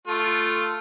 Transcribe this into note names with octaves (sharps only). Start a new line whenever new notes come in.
A3 F4